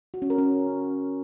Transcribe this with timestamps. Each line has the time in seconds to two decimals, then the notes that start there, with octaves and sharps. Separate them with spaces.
0.14 F#4
0.22 C#4
0.30 A#4
0.38 C#4